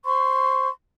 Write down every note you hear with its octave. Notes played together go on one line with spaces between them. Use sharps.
C5 C6 C#6